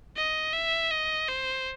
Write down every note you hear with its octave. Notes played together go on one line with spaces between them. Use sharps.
D#5
E5
D#5
C5